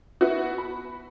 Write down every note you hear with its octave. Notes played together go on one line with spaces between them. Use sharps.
B3 E4 F#4
B5